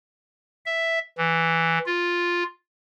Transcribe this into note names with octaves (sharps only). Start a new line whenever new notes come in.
E5
E3
F4